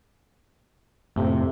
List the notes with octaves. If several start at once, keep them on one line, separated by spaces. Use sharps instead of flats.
F2 A2 C3 A3